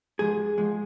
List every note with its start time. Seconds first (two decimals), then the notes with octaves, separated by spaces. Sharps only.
0.19 G#2 F3 G#3 G#4
0.58 G#2 F3 G#3